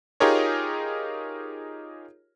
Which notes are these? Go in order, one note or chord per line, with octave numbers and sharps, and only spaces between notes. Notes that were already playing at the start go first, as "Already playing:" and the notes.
D#4 F4 G4 G#4 A#4 C#5